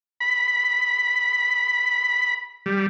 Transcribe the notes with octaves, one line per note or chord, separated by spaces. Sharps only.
B5
G3